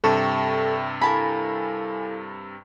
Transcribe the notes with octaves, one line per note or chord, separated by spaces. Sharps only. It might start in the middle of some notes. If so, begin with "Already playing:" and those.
G2 C3 A4 E5 G5 A5 C#6
E4 A4 A#4 F5 G#5 A5 B5